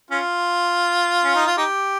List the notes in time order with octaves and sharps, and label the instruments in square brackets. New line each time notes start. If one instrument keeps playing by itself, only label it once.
[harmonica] C#4 F4
C#4
D#4
F4
D#4 G4